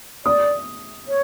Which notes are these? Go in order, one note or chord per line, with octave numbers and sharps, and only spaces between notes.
D5 D#6
C#5